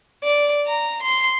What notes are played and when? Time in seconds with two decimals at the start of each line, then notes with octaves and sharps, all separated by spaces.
0.24 D5
0.66 A#5
1.02 C6